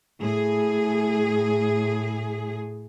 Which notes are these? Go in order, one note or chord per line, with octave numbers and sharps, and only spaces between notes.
A2 G#4